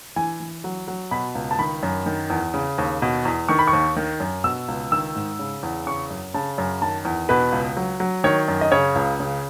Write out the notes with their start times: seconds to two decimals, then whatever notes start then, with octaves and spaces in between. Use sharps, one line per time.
0.16 E3 G#5
0.40 E3
0.64 F#3
0.88 F#3
1.11 B2 B5
1.35 C#2
1.51 A5
1.59 D#3 B5
1.83 F#2
2.06 D#3
2.30 E2
2.54 C#3
2.78 D#2
3.02 B2
3.25 E2
3.49 D#3 C#6
3.59 B5
3.68 C#6
3.73 D#2
3.96 D#3
4.20 F#2
4.44 B2 E6
4.68 C#2
4.92 D#3 E6
5.15 G#2
5.39 C#3
5.63 E2
5.87 C#3 C#6
6.10 F#2
6.34 C#3 A5
6.58 F#2
6.82 D#3 A5
7.05 E2
7.29 B2 B4
7.52 C#2
7.77 F#3
8.00 F#3
8.24 D#3 C#5
8.48 F#2
8.61 D#5
8.72 C#3 C#5
8.95 C#2
9.20 C#3